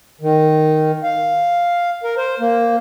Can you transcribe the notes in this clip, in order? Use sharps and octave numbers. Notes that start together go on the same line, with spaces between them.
D#3
F5
A#4
C5
A#3